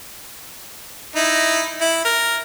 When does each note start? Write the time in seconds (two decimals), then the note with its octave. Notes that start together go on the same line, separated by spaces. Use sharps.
1.16 D#4 E4
1.81 E4
2.05 A#4